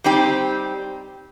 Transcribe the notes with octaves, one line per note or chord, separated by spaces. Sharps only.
G3 C4 D#4 G4